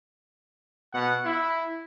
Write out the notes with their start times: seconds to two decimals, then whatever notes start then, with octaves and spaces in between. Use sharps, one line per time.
0.93 B2 F#5
1.25 E4